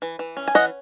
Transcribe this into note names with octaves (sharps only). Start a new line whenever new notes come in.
E3
E3
C#4
G#5
E3 D#5 F#5